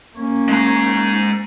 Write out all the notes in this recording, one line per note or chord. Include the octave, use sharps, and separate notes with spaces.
A#3 C#4
G#3 A#5